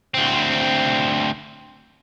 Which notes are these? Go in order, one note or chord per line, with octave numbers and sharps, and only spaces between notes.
D2 C4